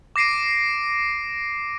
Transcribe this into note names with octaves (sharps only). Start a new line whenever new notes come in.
D6 A#6 C7 D7 D#7